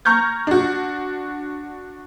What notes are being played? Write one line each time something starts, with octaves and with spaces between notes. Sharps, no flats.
A#5 C#6 F6 G6 G#6
D4 F#4